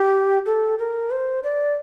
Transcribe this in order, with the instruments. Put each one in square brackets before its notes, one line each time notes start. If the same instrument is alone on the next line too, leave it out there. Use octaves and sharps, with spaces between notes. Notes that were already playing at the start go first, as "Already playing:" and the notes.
Already playing: [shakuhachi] G4
A4
A#4
C5
D5